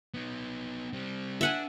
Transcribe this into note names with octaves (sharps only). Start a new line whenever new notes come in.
B3 D#4
G3 C4
D4 E5 F#5 G#5